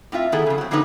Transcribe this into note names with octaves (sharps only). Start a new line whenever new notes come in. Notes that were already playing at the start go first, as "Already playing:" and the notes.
A2 C4 F4 E5
D#3 B3 E4 G#4 A4
F2 C#3
F#3 C4
F2 D3 F#3 A#3 D#4 B4